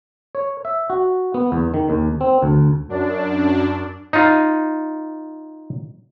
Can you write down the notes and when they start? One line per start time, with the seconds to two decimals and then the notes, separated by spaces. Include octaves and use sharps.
0.35 C#5
0.65 E5
0.90 F#4
1.34 B3
1.52 E2
1.74 D#3
1.90 D#2
2.21 C4
2.42 D2
2.89 F#2 D4
4.13 D#4 F4